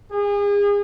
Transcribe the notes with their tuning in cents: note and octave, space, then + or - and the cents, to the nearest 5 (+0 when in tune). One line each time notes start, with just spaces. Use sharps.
G#4 -35